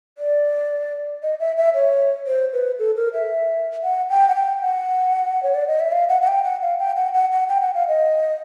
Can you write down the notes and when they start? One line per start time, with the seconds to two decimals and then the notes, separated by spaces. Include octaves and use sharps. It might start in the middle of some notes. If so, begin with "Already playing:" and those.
0.18 D5
1.23 D#5
1.40 E5
1.57 E5
1.74 C#5
2.27 C5
2.53 B4
2.79 A4
2.96 A#4
3.14 E5
3.84 F#5
4.10 G5
4.29 F#5
4.35 G5
4.62 F#5
5.43 C#5
5.55 D5
5.68 D#5
5.80 E5
5.92 F5
6.09 F#5
6.22 F#5
6.27 G5
6.44 F#5
6.62 F5
6.79 G5
6.96 F#5
7.14 F#5
7.32 F#5
7.49 G5
7.62 F#5
7.75 F5
7.88 D#5